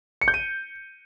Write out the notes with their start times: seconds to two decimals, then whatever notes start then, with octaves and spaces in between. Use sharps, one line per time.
0.22 C#7
0.28 G6
0.34 D#7